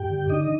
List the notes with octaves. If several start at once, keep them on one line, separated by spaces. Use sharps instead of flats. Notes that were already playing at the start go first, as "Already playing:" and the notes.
Already playing: G2 G4 G5
D3
D4 D#4 D#5